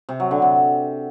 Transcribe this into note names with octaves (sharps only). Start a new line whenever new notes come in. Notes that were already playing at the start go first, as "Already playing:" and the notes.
C3
F#3
D3
C3